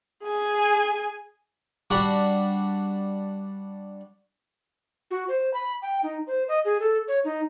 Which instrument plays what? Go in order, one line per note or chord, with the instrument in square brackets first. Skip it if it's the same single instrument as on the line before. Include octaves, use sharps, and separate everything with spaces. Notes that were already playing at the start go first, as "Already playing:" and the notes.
[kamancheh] G#4 G#5
[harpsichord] G3 D4 F#4
[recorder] F#4
C5
B5
G5
D#4
C5
D#5
G#4
A4
C#5
D#4